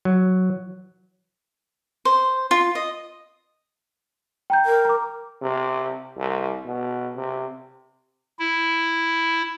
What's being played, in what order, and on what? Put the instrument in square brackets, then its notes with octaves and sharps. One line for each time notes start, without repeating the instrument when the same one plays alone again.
[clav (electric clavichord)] F#3
[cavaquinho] C5
F4
D#5
[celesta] G5 A#5 G6
[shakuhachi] A#4
[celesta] A#5 D6
[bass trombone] C3
C2
B2
C3
[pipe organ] E4